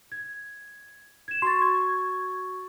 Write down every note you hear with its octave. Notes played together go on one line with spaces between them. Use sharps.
G#6
G#6 E7
F#4 C6 C#6 A6
G#6